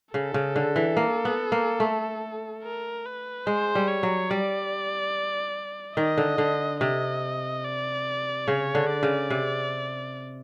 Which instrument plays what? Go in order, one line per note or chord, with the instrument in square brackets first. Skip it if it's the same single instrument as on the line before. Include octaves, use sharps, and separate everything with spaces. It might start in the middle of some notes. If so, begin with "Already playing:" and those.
[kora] C#3 [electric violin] A4
[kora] C#3
D3
E3
A#3
B3
A#3
A3
[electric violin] A#4
B4
[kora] G#3 [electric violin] C5
[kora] G3
[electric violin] C#5
[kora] F#3
[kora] G3 [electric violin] D5
[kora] D#3 [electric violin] D#5
[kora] D3
D3
[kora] C3 [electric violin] D#5
[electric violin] D5
[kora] C#3 [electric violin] C#5
[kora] D3
[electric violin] D5
[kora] C#3
C3